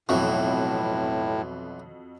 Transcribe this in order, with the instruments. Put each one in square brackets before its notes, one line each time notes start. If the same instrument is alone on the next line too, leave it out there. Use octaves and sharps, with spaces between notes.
[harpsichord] B1 E3 [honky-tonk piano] F2 F#4 C#6 [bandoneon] A2